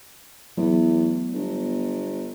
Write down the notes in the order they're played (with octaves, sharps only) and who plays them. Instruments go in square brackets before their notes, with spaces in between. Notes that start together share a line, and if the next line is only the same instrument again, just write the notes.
[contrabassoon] E2 [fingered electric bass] F#3 A3 B3
[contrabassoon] G1